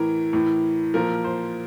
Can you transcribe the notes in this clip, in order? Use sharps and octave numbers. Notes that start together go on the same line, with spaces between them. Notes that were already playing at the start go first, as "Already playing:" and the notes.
Already playing: A2 E3 A#4
A2 E3
A#2 F3 A#4
C5